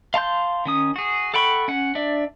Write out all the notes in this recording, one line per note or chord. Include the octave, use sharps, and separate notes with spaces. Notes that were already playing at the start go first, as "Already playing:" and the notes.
F5 A5 C6 G6
D#3 C#4 D#6
F#4 G#4
A4 F#5 G5 B5 C#6
C#4 F#5
D4 D5 E5